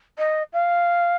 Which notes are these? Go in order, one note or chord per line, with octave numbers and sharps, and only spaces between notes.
D#5
F5